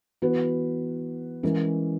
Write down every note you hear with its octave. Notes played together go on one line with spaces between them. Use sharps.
E3 B3 F#4 B4
E3 G#3 C#4 E4 A#4